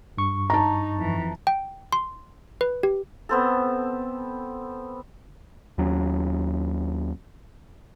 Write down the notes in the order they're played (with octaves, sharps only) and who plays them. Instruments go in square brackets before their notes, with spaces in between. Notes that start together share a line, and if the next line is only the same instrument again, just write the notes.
[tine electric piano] G2 C#6
[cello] D#4 [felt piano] A5 A#5
[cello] F2 E3
[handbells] G5
C6
B4
G4
[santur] B3 C4 A4
[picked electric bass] D#2 F#3 C#4